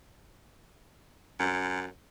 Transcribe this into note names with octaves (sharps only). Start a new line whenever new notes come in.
F#2